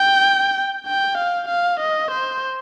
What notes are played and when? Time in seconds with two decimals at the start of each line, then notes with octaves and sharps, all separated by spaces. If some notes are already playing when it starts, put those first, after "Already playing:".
Already playing: G5
0.87 G5
1.18 F5
1.48 F5
1.80 D#5
2.11 C5